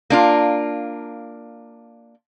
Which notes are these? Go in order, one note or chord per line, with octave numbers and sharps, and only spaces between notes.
A#3 D4 F4